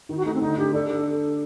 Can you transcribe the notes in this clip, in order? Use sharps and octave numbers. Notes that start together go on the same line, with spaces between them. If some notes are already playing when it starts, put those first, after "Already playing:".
D#3 D#4
F#4
A3 D#4
C4
D3 D#4
D3 G4
D4 A4
A4